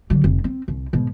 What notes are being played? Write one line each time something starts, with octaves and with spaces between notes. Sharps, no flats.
D3 F#3
F1
C4
C2
G#2 B2